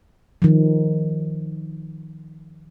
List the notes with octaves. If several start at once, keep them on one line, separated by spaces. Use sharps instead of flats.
D#3 F3